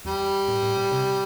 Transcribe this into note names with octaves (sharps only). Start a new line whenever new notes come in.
E2 G3
A2
A2
A#2
C3